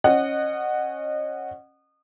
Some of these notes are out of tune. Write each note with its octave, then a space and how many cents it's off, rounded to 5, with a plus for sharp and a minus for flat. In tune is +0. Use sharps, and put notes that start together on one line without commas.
C#4 -20 D#5 -30 F#5 +0